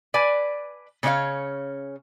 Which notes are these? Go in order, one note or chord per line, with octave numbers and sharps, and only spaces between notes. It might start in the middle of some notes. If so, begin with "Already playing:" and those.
B4 D5 G#5
C#3 C#4 D4 E4 C#5 F5